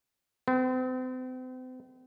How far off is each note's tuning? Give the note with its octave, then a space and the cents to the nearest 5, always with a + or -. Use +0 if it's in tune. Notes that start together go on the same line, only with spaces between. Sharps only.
C4 -40